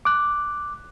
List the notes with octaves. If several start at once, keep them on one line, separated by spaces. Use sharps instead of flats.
D6 F#6